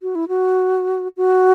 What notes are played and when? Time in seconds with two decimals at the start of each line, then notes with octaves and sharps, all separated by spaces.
0.02 F#4
0.15 E4
0.28 F#4
1.17 F#4